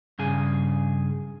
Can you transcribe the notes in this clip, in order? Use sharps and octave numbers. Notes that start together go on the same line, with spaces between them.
G2 C#3 G#4